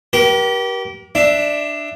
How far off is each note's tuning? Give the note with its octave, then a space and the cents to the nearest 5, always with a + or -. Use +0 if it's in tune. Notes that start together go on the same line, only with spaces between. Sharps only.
G4 -25 A#4 +40
D4 +10 E5 +0